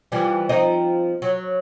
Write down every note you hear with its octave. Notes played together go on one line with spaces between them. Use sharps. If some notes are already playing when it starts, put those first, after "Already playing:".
E3 F3 G3
F3 C4 D#4
F#3